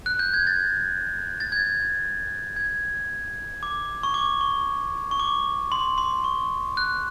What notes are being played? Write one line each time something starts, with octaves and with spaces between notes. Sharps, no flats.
F#6
G6
G#6
A6
A6
G#6
G#6
D6
C#6
D6
C#6
C#6
D6
C6
C6
C#6
F#6